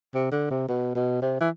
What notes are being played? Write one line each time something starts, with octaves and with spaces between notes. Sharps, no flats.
C3
D3
C3
B2
B2
C3
E3